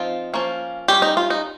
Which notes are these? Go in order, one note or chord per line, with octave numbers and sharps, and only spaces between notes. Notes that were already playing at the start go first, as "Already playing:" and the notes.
Already playing: F3 C4 D#4 F4
F3 A#3 C#4
G3 C#4 G4
D#4
F4
D#4